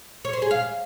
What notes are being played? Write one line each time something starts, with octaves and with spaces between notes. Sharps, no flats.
C#5
C5
G#4
F5